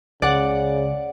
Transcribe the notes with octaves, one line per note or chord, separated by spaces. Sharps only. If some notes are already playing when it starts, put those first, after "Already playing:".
C#2 C#3 D5 F#5